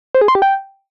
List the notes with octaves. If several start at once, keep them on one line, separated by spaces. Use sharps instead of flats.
C5
G#4
C6
G4
G5